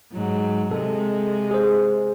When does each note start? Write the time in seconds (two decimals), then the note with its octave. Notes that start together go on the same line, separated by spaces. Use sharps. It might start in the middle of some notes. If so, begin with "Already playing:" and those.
0.12 G#2 F#3
0.71 C3 G#3 A4
1.51 G#4 C5